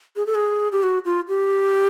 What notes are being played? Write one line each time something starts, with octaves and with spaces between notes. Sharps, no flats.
G#4
A4
G#4
G4
F#4
F4
G4